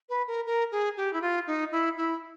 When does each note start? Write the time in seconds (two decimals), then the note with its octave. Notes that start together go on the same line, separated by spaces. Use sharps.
0.09 B4
0.27 A#4
0.46 A#4
0.72 G#4
0.97 G4
1.13 E4
1.22 F4
1.47 D#4
1.72 E4
1.97 E4